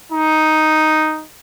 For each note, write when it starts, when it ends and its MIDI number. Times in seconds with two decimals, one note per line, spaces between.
0.12 1.23 63